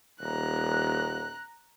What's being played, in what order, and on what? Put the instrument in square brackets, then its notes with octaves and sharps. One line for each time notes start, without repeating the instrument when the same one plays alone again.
[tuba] D#1 [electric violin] A#5 F#6